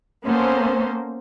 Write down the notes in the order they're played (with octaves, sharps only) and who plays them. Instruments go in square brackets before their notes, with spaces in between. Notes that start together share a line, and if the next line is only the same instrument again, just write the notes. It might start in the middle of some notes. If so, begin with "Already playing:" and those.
[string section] A#3 B3 C#4 A4 C5